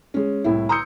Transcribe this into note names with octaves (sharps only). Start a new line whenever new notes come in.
G#3 C#4
C2 A2 E4
A#5 C6 D#6 E6 G6 C#7